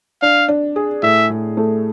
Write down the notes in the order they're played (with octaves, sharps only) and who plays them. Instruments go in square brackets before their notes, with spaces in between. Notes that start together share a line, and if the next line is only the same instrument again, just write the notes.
[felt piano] D4 [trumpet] F5
[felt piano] D4
G#4
[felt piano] A2 [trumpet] E5
[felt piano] A2
A3